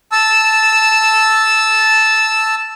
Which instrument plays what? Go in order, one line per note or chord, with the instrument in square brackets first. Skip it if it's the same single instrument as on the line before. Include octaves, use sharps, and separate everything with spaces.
[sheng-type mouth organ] A5 E6